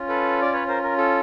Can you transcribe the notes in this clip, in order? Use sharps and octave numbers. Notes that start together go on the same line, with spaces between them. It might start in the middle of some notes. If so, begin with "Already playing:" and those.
Already playing: C#4 F4
A4 B4
D5
B4 C#5
A#4 C5
A#4
A4